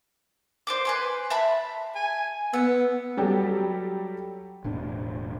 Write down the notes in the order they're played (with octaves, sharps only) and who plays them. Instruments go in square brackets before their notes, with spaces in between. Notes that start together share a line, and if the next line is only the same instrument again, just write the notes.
[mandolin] C5 D5 D6
B4 G#5 C6
E5 A5 B5
[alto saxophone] G#5
[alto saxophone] B3 [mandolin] E6
[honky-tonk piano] F#3 G3 G4 A4
[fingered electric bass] E1 A2 D4